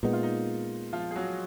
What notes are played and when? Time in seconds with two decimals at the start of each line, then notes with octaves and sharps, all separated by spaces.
0.03 A#2 G#3 B3 D#4
0.13 F4
0.23 D#4
0.93 F3 F4
1.11 G#4
1.16 F#3 F#4